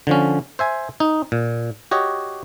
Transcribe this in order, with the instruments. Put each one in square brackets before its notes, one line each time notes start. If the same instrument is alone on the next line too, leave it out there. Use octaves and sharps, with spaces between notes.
[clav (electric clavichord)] D3 F3 C#4
C5 E5 G#5
D#4
A#2
F#4 G4 C#5 D#5